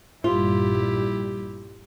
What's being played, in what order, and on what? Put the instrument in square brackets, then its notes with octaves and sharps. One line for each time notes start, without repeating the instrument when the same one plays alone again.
[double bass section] A#1 G2 G3 [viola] E4 G4 [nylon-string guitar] F4